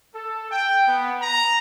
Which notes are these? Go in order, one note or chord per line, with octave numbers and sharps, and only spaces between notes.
A4
G5
B3
A#5